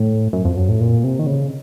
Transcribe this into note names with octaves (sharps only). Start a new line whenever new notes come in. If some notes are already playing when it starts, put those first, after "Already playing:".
Already playing: A2
F#2
F2
F#2
A2
A#2
C3
D#3
C#3